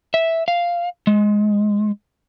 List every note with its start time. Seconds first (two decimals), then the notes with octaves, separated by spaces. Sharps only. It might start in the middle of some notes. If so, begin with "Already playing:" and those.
0.14 E5
0.48 F5
1.07 G#3